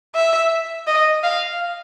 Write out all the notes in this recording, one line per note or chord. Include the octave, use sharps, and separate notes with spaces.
E5
D#5
F5